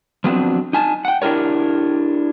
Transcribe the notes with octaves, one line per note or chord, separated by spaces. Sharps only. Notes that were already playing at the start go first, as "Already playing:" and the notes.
F3 F#3 B3 C4 D4
D#4 G#5 A5
F#5 G5
D4 E4 G4 A#4 C#5